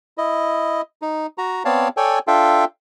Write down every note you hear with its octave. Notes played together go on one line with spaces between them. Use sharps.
E4 D#5
D#4
F#4 A#5
B3 C4 C#5 D5 F5 A5
A4 C#5 D5 G5 G#5
D4 F4 A4 E5 F5 G5